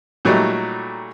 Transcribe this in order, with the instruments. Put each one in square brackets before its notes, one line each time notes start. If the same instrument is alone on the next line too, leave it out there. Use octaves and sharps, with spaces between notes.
[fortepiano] A#2 F#3 G3 A3 D#4